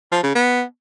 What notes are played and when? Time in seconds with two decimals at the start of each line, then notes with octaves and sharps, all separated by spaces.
0.12 F3
0.23 C#3
0.35 B3